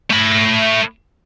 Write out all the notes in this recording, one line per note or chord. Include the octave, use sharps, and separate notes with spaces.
A3 B5